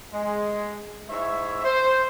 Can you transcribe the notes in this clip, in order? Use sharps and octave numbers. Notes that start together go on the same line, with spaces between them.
G#3
G#2 E4 C#5 E5
C5